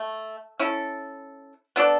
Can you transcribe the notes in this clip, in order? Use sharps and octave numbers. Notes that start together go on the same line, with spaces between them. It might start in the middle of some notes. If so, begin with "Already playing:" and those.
Already playing: A3
C#4 E4 A4
B3 D4 A4 D5